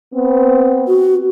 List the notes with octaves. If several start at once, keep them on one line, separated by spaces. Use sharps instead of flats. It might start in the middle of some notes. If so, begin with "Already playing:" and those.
B3 C4
F#4